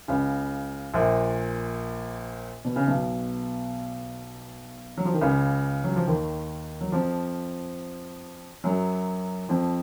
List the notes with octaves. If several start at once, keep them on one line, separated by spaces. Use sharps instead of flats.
C#2 C#3
A#1 A#2
B2
C#3
B1 B2
F#3
F3
D#3
C#2 C#3
F#3
F3
D#2 D#3
F#3
F2 F3
F#2 F#3
F2 F3